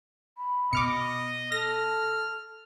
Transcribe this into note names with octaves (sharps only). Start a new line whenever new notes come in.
B5
B2 D#5 D6 F6 C#7
A4 F6 A#6